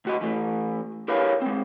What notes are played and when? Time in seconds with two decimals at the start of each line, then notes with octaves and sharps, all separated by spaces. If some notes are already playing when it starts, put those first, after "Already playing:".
0.05 D2 F#4 D#5
0.21 E3 A3
1.08 E4 G4 A#4 B4 C#5 F5
1.42 G#3 C4